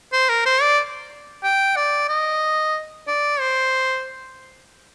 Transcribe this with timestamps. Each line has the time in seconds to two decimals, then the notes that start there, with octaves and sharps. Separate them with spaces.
0.13 C5
0.29 A#4
0.46 C5
0.62 D5
1.43 G5
1.76 D5
2.09 D#5
3.07 D5
3.40 C5